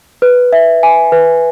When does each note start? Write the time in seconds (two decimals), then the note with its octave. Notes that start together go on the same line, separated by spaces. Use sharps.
0.22 B4
0.53 E5
0.83 G#5
1.12 B4